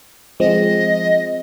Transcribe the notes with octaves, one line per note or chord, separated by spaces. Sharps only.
F3 G#3 C4 D#5